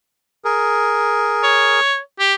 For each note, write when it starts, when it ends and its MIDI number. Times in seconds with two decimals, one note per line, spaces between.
0.45 1.80 68
0.45 1.80 70
1.43 1.99 73
2.20 2.34 67